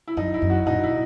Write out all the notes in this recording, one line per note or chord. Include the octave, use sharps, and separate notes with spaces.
E4
F#2 D#4
E4
F#2
F#4
A#2 D#4
B2 E4